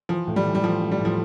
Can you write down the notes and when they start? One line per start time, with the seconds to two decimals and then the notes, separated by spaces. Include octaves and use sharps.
0.09 E3 F3
0.27 A2
0.36 G3
0.46 E3
0.55 G3
0.64 F3 A3
0.82 A3
0.91 G3
1.00 A2 F3